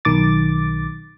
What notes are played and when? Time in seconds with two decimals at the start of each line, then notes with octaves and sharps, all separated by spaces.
0.05 B1 D#3 D6 A6